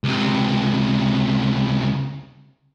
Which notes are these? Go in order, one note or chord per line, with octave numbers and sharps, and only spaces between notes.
C#2 C3